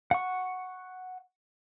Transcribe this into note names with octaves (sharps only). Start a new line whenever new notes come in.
F#5 C#6